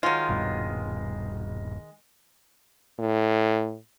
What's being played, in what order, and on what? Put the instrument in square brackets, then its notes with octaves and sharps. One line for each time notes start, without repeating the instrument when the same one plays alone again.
[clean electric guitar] D#3 G#3 [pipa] F#3 F4
[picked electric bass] D#1 G2 B2
[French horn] A2